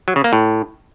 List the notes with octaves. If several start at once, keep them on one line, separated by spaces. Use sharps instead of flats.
F#3
C#3
A#3
A2